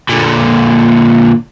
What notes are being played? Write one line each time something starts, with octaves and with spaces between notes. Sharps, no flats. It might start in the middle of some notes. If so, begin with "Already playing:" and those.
A#2 D3